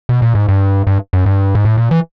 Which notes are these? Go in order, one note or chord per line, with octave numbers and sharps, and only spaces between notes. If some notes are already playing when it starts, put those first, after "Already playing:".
B2
A#2
G#2
G2
G2
F#2
G2
G#2
A2
A#2
E3